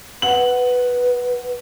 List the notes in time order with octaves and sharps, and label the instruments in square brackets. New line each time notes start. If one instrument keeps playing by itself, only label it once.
[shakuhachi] B4 [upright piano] F#5 F#7